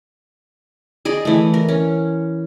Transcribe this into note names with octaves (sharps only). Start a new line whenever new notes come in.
G#4 D5 D#5
E3 A3
A#4
C#4